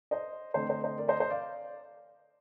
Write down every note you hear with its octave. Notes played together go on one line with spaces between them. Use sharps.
C5 D#5
D3 A3 C4 C5 D#5
C5 D#5
C5 D#5
A#4 D5
C5 D#5
C5 D#5
D5 F5